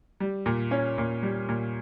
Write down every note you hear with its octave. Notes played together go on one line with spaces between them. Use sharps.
G3
A#2
C#4
A#2
G3
A#2